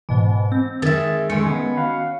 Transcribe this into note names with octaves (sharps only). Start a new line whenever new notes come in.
G#2 B2 E3
C4
D#3 G#3 G#4 E5 A6
G#3 A3 C#4 C#7
D#3 A#3 B3
F#4 F5